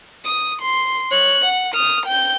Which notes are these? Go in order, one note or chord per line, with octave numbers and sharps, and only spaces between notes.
D#6
C6
C#5 F#6
F#5
D#6 F6
G5 G6